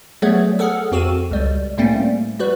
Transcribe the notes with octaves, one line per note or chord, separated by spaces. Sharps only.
F#3 G3 A3 B3 G#4 C#5
G#4 A4 F#5 F6
F2 C4 F#4 A4 D#7 E7
C#2 G3
A2 G3 A3 A#3 C4 C#4
G3 F#4 B4